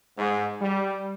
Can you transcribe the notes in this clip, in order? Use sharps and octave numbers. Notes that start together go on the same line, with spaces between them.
G#2
G3